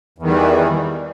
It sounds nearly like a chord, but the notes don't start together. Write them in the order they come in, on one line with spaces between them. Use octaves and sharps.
E2 D#3 G3 E3